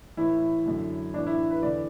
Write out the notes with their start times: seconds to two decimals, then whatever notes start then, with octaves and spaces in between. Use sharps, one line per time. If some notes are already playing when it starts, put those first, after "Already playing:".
0.17 A2 E3 E4
0.66 F#2 D3
1.14 A2 E3 D4
1.27 E4
1.51 B4
1.62 E2 D3 D5